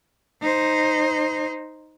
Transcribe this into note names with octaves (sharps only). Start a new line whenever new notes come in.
D#4 C5